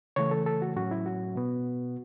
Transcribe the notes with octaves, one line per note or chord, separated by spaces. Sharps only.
C#3 E3 A3 C#5
A4
A4
F#4
A2 F#3 C#4 F#4
E4
F#4
B2 B3